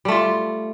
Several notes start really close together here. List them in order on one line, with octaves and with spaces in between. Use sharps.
G3 A3 F4